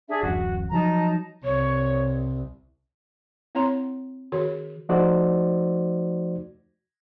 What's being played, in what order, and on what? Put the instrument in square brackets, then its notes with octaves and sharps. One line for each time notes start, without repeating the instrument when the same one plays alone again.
[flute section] D4 G#4 E5
[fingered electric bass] D1 A1 F#2 [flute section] F#4
[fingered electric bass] F3 F#3 [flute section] D#4 A5 A#5
[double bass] C2 [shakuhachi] C#5
[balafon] C4 E4 C#5 A#5 C6
D#3 F#4 G#4 C#5
[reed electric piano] F3 A3 D#4 F#4 C5 D5